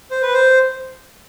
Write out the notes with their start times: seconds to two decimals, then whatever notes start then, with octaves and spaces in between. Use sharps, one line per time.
0.11 C5
0.22 B4
0.34 C5